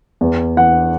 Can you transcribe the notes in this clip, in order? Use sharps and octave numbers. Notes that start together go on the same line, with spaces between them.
E2
E3 F#5